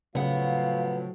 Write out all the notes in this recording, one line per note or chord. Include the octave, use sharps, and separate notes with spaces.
A2 C#3 F3 F#3 B3 F5 F#5